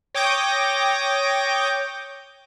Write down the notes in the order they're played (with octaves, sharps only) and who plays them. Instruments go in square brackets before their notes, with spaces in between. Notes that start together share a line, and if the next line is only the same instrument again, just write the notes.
[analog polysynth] C#5 G5 D6 D#6 G6 A#6